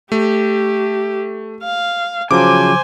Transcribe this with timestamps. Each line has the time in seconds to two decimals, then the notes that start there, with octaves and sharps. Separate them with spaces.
0.12 A3 G4
1.63 F5
2.31 C#3 F3 F#3 C5 G#5 D6